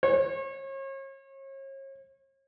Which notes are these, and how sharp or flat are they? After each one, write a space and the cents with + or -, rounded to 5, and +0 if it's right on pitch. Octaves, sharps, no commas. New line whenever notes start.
C#5 -40